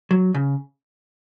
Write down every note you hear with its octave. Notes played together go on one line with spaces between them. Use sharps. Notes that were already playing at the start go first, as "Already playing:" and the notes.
F#3
C#3